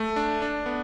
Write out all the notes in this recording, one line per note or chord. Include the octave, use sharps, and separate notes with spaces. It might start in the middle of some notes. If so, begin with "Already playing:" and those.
Already playing: A3
D4
D4
B3